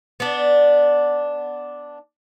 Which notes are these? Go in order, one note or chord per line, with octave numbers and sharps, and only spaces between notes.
B3 D4